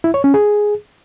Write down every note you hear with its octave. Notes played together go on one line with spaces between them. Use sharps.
E4
C#5
C#4
G#4